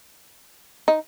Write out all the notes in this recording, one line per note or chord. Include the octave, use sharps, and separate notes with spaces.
D#4